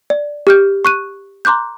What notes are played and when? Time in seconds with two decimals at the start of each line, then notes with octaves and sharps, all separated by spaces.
0.10 D5
0.47 G4 F6 G6
0.85 C#6 F#6 D#7
1.45 A#5 C6 D6 F#6 G6